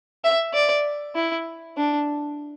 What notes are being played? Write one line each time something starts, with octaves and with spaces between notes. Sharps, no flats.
E5
D5
E4
D4